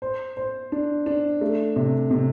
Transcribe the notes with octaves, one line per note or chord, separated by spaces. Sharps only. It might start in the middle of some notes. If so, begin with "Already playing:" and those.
C5
C5
D4
D4
A3
C3
C3